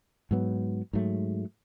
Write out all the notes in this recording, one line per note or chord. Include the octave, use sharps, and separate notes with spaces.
G#2 F#3 B3
G#2 F#3 A3